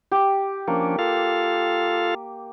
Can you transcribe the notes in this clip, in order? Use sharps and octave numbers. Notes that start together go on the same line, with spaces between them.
G4
F3 A#3 C#4 D4
F4 A4 F5